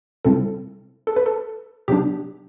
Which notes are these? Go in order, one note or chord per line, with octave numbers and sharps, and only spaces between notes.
C3 G3 C4 E4 A4
A4
B4
A4
C3 F#3 B3 D4 G4